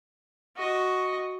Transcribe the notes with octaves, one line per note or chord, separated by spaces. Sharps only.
F#4 D#5